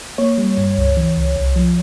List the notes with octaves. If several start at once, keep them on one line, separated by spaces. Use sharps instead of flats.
A#3 C#5
G3
G2
C#2
E3
C#2
C2
F3